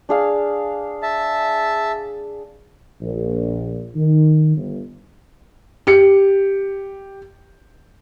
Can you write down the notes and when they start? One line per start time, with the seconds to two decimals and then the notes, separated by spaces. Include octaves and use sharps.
0.09 D4 G#4 F5
1.03 E5 A5
3.01 A#1
3.96 D#3
4.56 G1
5.87 G4 C#7